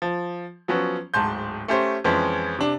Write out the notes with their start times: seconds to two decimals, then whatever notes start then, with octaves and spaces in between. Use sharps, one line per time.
0.02 F3
0.68 F3 F#3 B3 C#4
1.14 D1 G#2 A5 C6 G6
1.68 A3 C#4 G4 C5
2.04 F2 E3 F3 G#3 C#4
2.59 C3 D4